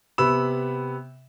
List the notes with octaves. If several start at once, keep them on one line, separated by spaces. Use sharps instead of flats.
C3 B3 B5 E6 E7